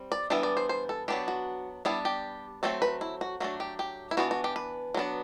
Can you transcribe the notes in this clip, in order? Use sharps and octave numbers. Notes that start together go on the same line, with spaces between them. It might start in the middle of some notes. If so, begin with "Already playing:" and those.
Already playing: G3 C4
D5
E3 G3 B3 D4 E5
D5
C5
C5
A4
F#3 B3 D4 G4
F#4
G3 B3 D4 E4
G4
F#3 A3 C4 A4
B4
E4
F#4
F#3 A3 D4 F#4
G4
G4
E4
E3 B3 D4 F#4
F#4
G4
B4
F#3 B3 D4